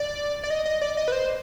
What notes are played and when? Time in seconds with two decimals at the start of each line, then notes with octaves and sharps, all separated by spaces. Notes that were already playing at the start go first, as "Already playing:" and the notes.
Already playing: D5
0.43 D5
0.50 D#5
0.65 D#5
0.81 D5
0.97 D#5
1.08 B4
1.12 C5